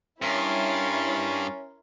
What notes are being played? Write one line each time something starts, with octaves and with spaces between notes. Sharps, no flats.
G2 C#4 E4 A#4 C#5 C6 A6